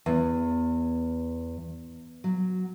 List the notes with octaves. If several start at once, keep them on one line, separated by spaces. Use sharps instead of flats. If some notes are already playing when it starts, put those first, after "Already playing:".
E2
F#3